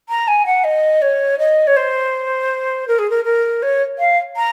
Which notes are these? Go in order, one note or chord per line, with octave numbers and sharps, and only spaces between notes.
A#5
G#5
F#5
D#5
C#5
D#5
C#5
C5
A#4
G#4
A#4
A#4
C#5
F5
A#5